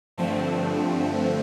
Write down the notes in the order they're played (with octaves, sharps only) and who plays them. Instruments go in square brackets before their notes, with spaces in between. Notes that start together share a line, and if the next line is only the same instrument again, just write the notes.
[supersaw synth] G2 D3 F3 A3 C4